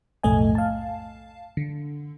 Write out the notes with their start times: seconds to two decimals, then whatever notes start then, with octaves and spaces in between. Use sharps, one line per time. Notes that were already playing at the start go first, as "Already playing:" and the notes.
0.23 B1 F2 A2 A3 D#5 G#5
0.55 F5 A5
1.57 D3